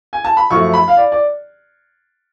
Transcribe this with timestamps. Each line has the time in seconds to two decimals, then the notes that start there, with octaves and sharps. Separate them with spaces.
0.13 G#5
0.24 A5
0.37 B5
0.50 F#2 F3 A3 C#6
0.73 B5
0.88 F5
0.97 D5
1.12 D5